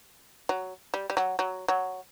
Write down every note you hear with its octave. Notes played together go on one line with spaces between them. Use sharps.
F#3
G3
G3
F#3
F#3
F#3